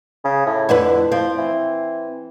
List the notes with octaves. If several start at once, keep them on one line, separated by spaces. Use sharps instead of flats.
C#3
A2
F2 D3 E4 B4
F3 C4
E3